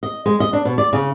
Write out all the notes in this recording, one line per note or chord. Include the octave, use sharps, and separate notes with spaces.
D#5
G#3
D#5
D4
B2
D5
C#3